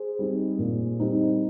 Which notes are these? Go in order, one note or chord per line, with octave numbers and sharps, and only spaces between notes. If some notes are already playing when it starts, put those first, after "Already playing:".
Already playing: G#4 C5
G3 C4 D#4
A#2
G3 C4 D#4